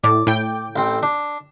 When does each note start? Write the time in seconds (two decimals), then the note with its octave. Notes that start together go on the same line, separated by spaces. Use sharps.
0.04 A2 D5
0.27 A2 G5
0.76 A1 C4
1.03 D4